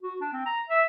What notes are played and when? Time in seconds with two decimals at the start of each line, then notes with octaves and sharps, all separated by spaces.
0.02 F#4
0.21 D4
0.33 C4
0.46 A#5
0.69 E5